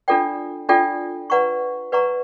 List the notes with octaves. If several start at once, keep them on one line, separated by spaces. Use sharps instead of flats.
D4 F4 A4 D5 G5
D4 F4 A4 D5 G5
B4 D5 F#5 A#5 C#6
B4 D5 F#5 A#5 C#6